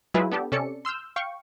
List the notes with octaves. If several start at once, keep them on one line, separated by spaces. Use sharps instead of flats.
F#3 G#3 E4 F4 G#4 B4
B3 D4 G4 A4
C3 C#4 A4 D5 C#7
C6 E6 F6 G6
F5 G5 C#6